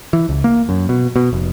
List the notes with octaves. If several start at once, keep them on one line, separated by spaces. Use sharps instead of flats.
E3
C#2
A#3
F#2
B2
B2
F1